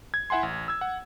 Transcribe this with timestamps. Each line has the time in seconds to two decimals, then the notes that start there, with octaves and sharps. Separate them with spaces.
0.14 G#6
0.30 E4 E5 F#5 G#5 C6
0.43 A1
0.68 E6 G#6
0.81 F#5